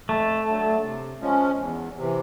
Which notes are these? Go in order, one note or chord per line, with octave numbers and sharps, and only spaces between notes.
F2 A3
D3 F#3
C3
F3 G#3 C#4
E2
C3
E3